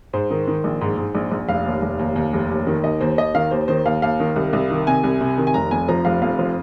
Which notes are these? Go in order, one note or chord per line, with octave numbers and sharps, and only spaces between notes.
G#2 C5
D#3
D#3
A#1
G#2
G#2
A#1
A#1
F1 F5
D#2
F1
D#2
D#2
F1
D#2
D#3
D#2 D#5
D#2 C5
D#2 D#5
D#3 F5
D#2 C5
D#3 C5
D#2 F5
D#2 F5
D#3
C2
C2
D#3
C3 G#5
C2
C3
D#3
G#5
F1 A#5
F2 G#5
F3 A#5
F1 F5
F2 F5
F3